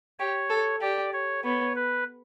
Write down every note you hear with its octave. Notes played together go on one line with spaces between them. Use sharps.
G4 C#5
A4
G4 D5
C#5
B3 C#5
B4